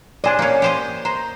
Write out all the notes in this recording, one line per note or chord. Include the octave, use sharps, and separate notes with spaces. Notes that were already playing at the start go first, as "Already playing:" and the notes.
D4 C5 D5 D#5 G#5
A#3 C#4
G4 C5 D#5
C5 A#5